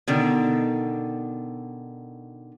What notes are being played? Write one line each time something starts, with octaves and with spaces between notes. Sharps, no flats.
B2 D3 D#3